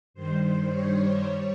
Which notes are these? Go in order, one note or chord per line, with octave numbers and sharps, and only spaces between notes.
G2 D#3 G3 C5
C#5
G3